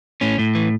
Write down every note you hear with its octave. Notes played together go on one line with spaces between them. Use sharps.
A2 C#4
A2
E3